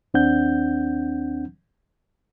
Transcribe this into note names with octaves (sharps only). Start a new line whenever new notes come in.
D#2 C4 D4 F#5 G6